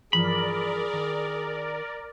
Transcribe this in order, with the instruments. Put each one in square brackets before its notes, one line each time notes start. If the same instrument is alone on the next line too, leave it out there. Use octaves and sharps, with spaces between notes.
[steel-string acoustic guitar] G2 E3 F3 [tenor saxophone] G#4 [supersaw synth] A#4 D5 [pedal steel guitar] B5
[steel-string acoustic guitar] D#3